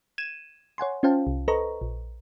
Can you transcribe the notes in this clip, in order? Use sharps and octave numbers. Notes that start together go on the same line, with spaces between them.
G#6 D#7 E7
C#5 F#5 G#5 C6
C#4 F4 C5 F5 G5 A5
C2
A4 B4 C5 D#5 A#5 C#6
A#1